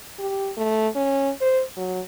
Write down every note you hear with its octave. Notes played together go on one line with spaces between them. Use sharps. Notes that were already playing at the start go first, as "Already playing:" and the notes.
G4
A3
C#4
C5
F#3